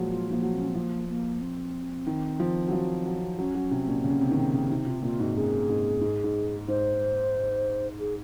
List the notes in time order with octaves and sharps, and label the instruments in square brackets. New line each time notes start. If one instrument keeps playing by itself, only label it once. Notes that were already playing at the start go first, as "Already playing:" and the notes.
Already playing: [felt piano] A#2 F3 F#3 G#3
[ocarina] F4
[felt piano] F3 [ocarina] A#3
[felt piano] F#3
[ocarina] C4
C#4
C4
[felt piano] F3 [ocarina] A#3
[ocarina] A#3
C4
[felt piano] D#3
F3
F#3
F3
F#3
[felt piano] F#3 [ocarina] C#4
[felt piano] F#3
C3
A#2
C#3
C3
D#3
C#3
C#3
[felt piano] C3 [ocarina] D#4
[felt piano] C3 [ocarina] F4
[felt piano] A#2 [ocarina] F4
[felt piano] G#2 [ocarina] F#4
[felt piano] F#2 [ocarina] G#4
[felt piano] G#2
G#2
G#2
[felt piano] G#2 [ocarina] C5
[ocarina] G#4